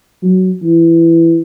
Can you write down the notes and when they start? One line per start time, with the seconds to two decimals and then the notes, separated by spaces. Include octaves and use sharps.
0.22 F#3
0.62 E3